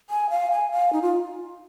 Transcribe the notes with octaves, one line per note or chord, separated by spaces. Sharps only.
G#5
F5
G#5
F5
D#4
F4